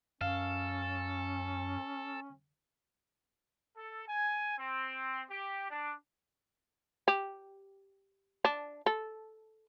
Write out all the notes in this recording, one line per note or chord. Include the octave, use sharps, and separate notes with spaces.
F#2 C#4 A4 F5
A4
G#5
C4
G4
D4
G4
D4
A4